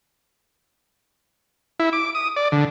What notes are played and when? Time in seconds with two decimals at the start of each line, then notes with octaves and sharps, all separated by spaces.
1.80 E4
1.93 D6
2.15 D#6
2.36 D5
2.52 D3